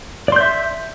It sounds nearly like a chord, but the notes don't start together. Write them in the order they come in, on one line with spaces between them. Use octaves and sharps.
D5 C6 G6 E5